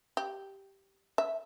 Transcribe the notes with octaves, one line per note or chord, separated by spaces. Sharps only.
G4
E5